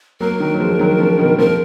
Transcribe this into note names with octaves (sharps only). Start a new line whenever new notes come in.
F#3 A#3 A#4
D#3 F#3
F#3
F3 G#3
D#3 F#3
C#3 F3
B2 D#3
C#3 F3 A#4